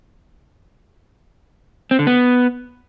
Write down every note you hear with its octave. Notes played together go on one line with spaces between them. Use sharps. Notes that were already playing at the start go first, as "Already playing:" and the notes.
C4
D3
B3